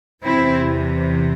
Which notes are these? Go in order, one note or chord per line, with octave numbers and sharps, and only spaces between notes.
E2 C3 E3 C4 E4